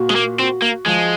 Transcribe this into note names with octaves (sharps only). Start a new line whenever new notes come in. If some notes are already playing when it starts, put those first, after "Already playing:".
Already playing: A#2 F#4
G#3
A#3
C4 F#4
A#3
F3 G#3